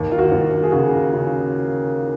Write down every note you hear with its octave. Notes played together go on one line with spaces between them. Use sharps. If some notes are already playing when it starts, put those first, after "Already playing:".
Already playing: D#2
F4
F#4
D#2
G#4
C#3 F#4
C#3